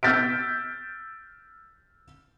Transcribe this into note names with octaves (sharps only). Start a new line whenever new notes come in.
E6 F6 G6 A6 B6 D7